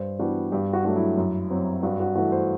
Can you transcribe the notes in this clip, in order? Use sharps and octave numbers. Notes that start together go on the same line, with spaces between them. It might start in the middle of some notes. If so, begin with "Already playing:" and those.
Already playing: G2 C5
E3 G3 B3 D4 F#4
G2 G4
F#4
F#3 A3 D4 F#4
E4
F#2
F#3 C4
G2 F#4
F#4
E3 A3 F#4
C5